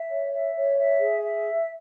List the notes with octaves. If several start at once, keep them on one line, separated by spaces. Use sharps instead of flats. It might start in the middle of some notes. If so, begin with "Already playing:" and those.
Already playing: E5
C#5
E5
C#5
E5
G#4
E5